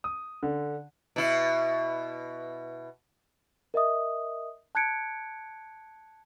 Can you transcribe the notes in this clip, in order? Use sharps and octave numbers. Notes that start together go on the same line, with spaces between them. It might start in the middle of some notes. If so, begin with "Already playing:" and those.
D#6
D3
B2 E4
A#4 D#5 E5 D#6
A5 F#6 G#6 C#7 D7